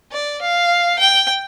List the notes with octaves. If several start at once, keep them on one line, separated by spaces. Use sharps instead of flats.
D5
F5
G5